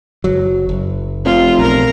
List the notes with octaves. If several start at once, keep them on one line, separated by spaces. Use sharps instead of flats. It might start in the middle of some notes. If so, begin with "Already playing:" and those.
F#1 F#3
F#1
F1 F4
B1 A#4 A#5